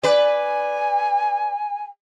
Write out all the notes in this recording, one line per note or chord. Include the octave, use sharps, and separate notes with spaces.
B4 D5 G#5